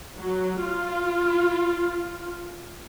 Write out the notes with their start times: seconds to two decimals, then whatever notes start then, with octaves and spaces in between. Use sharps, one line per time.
0.18 F#3
0.60 F4